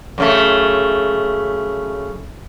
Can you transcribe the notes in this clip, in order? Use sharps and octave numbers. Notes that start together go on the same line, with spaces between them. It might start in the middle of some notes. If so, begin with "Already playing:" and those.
F#2 C#3 A3